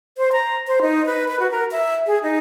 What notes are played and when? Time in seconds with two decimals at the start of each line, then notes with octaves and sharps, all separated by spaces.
0.18 C5
0.33 A#5
0.67 C5
0.82 D#4
1.06 B4
1.28 B4
1.40 F#4
1.51 A#4
1.72 E5
2.07 G#4
2.23 D#4